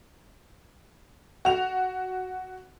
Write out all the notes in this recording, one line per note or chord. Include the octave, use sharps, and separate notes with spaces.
F#4 F7